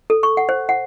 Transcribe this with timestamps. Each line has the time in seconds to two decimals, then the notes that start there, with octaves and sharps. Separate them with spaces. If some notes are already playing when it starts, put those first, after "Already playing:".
0.10 A4
0.23 C#6
0.37 F#5
0.49 C5
0.69 F#5